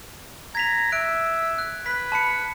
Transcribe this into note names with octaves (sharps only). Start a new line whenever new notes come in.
A#5 G#6 B6 F7
E5 F#6 D7
F#6
B4 B6
A5 B5 C#7